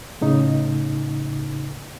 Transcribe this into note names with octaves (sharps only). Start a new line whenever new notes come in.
A2 C#3 D#4